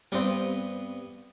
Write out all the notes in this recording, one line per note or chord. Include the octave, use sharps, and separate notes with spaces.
G2 G3 B3 C4 G5